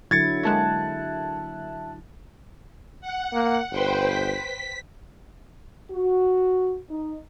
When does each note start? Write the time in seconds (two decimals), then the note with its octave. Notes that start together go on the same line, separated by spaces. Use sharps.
0.11 D3 F#3 E4 G#6 A6 C#7
0.43 G#3 A#3 F#4 E5 A5 F#6
3.01 F#5
3.33 A#3
3.71 G1 B4 C5 G5
4.06 B6
5.90 F#4
6.89 D#4